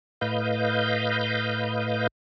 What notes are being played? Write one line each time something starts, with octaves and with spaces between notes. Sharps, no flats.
A2 B4 D#5 F5 G6